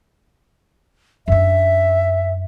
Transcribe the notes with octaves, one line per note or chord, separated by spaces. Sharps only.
F#2 D4 E5